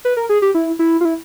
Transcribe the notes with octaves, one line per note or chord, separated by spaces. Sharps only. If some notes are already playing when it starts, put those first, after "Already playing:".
B4
A#4
G#4
G4
E4
E4
F4
E4